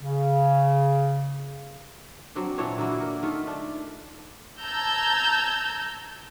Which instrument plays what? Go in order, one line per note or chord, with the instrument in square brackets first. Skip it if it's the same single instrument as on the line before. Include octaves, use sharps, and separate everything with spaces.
[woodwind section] C#3
[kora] F#3 C4 D4
A#2 E3 D4 C#5
D3 F#3 A#3 E4
A#4
D#3 A3 F4
D4
[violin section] A5 A#5 E6 G6 G#6